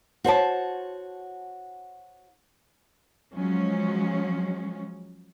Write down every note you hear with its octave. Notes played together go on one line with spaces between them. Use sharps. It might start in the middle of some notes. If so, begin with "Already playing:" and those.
F#4 C5 C#5 A5
F3 F#3 G#3 C#4